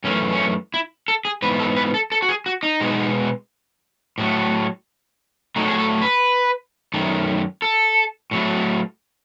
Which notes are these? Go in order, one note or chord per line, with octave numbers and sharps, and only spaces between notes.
F#2 E3 A3 C#4
C#4
E4
A4
G#4
G#2 E3 B3 B4
A4
B4
A4
A4
F#4
G#4
F#4
D#4
B2 G#3 B3
A2 F#3 A3
A2 F#3 A3 D#4
G#4
A4
B4
F#2 D#3 A3
A4
A2 F#3 A3